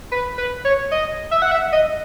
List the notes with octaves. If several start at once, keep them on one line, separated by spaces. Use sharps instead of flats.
B4
B4
C#5
D#5
E5
F#5
E5
D#5